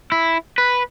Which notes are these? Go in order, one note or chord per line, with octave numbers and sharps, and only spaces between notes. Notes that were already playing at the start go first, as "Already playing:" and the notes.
E4
B4